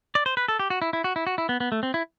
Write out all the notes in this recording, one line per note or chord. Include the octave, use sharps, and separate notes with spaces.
D5
C5
B4
A4
G4
F#4
E4
E4
F#4
E4
F#4
E4
B3
B3
A3
C4
E4